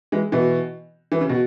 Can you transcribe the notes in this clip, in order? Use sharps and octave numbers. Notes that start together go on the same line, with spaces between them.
E3 G#3
B2 E3
E3
C#3
B2